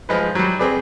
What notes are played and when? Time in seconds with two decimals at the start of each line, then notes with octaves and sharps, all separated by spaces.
0.09 F3 G#3 B4
0.35 F#3 G3
0.59 C4 G#4 B4 D5